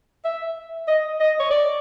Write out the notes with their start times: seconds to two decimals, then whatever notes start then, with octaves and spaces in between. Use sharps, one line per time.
0.25 E5
0.88 D#5
1.20 D#5
1.39 C#5
1.50 D5